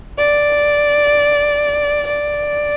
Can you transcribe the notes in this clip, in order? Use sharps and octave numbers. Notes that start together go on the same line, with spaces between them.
D5
D5